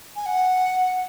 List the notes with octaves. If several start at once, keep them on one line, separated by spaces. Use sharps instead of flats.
G#5
F#5